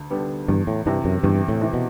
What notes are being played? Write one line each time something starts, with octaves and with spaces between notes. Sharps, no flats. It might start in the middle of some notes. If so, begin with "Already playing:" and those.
Already playing: D2 D3
D3 G3 B3
E2 G2
A2
G2 C3 E3
F#2
E2 G2
A2
C3 E3
B2